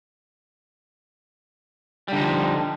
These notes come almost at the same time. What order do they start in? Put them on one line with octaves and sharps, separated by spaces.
G3 D3 D#4 F3